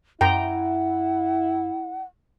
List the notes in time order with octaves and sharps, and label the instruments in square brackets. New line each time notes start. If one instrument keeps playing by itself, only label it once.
[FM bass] F#2 [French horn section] E4 [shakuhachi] F#5 [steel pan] G5 A#5